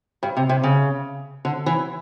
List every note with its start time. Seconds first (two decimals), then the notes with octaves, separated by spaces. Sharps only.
0.23 G2
0.37 C3
0.49 C3
0.63 C#3
1.45 D3
1.66 E3